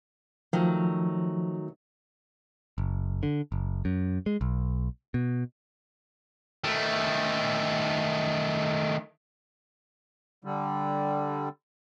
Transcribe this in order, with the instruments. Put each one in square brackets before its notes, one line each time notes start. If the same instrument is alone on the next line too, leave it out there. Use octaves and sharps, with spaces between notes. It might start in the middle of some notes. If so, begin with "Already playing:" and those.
[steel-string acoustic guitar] D#3 F#3 A3 [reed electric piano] F3
[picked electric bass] F#1
D3
F#1
F#2
G#3
B1
B2
[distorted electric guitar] D#3 A3
[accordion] D3 G3